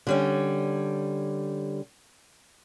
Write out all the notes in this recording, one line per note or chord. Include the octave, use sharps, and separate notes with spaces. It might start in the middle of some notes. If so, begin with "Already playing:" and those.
D3 G3 C#4